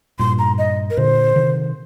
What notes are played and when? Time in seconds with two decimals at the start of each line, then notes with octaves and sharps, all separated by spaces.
0.19 G2 A#2 C6
0.39 A#5
0.58 D#5
0.90 A#4
0.97 A#2 D3 C5
1.36 C3 D#3